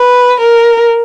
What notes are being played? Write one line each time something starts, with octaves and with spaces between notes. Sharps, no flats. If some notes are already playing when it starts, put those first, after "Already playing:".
Already playing: B4
A#4